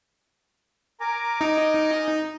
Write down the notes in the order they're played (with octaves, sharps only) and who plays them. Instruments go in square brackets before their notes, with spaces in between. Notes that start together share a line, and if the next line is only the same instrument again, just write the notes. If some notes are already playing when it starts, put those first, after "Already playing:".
[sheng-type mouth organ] A#4 G#5 D6 [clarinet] A#5
[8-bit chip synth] D#4 [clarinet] D#5